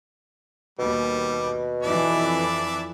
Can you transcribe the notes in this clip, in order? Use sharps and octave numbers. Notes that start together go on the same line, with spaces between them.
D#2 B2 G3
F2 E3 D4 D5 E5